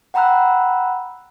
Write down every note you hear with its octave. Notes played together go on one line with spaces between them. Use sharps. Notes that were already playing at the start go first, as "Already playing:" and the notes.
F#5 G5 A#5 B5 E6 F#6